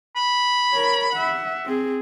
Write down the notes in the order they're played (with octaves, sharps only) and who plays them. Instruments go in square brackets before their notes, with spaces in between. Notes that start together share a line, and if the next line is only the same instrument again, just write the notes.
[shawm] B5
[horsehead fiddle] A#4 C#5
E5 F#5
C4 G#4